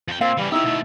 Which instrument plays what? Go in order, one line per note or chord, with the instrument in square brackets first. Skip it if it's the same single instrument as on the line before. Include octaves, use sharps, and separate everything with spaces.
[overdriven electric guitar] F2 G5
[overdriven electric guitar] A#2 [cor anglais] C4 [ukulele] F5
[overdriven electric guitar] C#3 E3 [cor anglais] G3
[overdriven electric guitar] D#3 G4 [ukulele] D#4 E4 [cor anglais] E5
[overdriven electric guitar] B2 A3